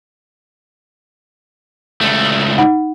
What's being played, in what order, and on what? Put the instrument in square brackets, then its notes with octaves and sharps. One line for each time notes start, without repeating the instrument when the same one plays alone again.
[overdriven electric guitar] C#2 A3
[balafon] D#4 F#5